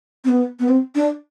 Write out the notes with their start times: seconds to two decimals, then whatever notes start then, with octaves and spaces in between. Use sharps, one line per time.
0.25 C4
0.29 B3
0.60 B3
0.69 C4
0.95 D4